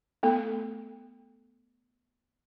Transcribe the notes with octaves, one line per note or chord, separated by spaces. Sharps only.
A3 B3 A4